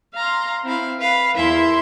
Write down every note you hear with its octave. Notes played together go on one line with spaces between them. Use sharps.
F5 A#5 C6
C4 E4 F5
B4 F5
E2 E4 A#4 E5 C6